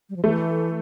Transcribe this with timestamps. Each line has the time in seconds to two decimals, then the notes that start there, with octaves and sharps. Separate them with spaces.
0.10 G3
0.16 F3
0.24 E3 A3